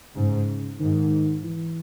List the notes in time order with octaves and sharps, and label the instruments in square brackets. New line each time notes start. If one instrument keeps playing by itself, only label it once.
[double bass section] G#2 [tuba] C#3
[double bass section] G#2 [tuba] D#3
[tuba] E3